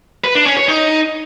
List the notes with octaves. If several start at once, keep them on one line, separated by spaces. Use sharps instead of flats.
B4
D4
C#4
C#5
D#4